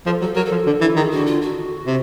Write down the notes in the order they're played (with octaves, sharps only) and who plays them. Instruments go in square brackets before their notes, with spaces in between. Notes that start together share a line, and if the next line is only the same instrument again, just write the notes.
[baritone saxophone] F3 [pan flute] A4
[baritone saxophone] F#3 [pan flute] A4
[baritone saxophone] F#3 [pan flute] A#4
[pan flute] A4
[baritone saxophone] F3
D3
E3
[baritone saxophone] D#3 [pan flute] G#4
[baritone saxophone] D3 [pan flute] F#4
[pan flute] F4
F#4
[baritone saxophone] C3